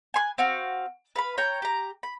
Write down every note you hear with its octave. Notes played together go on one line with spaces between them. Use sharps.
G#5 C6 F#6
C4 F#4 F5
B4 F5 B5
C#5 G5 A#5
G4 A#5
B5